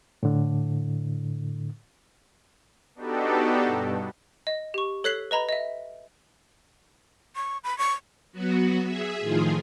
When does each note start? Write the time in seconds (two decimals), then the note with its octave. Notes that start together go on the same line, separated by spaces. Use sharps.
0.23 A2 D3
2.95 B3 D4 D#4 F#4 G4 A4
3.64 G2 B2
4.47 D#5
4.74 G4 C#6
5.04 A4 C#5 F#6 B6 C7 F#7
5.31 B4 D#5 A#5 B5
5.49 D#5 E5
7.36 C#6
7.64 B5
7.78 C#6
8.32 F#3 B3 F#4
8.84 G#4 E5
9.20 A2 D#3 F3 F4 G#4